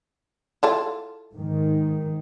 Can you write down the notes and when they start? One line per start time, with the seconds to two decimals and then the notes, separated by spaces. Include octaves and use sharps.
0.63 E4 F4 A4
1.34 G#2 D#3